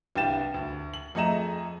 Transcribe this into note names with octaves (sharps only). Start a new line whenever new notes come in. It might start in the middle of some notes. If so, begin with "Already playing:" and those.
C2 G2 G4 G5 A6 E7
D2
F#7
F2 A3 G#4 D#5 A#5 E7